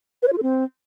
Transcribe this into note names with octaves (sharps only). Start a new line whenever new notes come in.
B4
C#5
F4
A4
C4